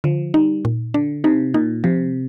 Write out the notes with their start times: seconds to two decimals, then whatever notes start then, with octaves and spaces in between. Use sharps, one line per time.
0.04 D3 F3
0.34 G3 D#4
0.65 A#2
0.94 D3 D4
1.24 C3 D#4
1.54 A#2 D#4
1.84 C3 F3